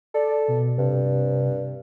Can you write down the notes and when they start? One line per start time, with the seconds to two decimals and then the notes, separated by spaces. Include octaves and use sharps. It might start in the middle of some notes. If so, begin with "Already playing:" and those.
0.14 A4 D5
0.48 B2
0.78 G2 C3